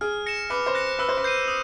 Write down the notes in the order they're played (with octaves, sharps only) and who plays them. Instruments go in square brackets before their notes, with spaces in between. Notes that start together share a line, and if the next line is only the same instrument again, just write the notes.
[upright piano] G#4 [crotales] F6
[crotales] A#6 C#7 E7
[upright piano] B4 [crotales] D6
[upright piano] C5
[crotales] F#6 A#6 C#7
[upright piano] B4 [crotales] E6
[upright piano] C5
B4
[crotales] G6 C7 D#7
D#6